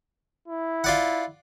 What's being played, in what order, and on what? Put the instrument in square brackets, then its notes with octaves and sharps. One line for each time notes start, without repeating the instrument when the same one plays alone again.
[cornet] E4
[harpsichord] F4 D5 F#5